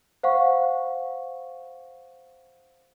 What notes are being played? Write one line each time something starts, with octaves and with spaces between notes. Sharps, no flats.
C5 F5 F#5 C#6